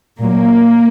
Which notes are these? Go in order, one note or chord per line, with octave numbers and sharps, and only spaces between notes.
A#2 F#3 A#3